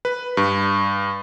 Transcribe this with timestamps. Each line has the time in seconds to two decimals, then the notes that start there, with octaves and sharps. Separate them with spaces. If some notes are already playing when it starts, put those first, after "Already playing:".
0.05 B4
0.37 G2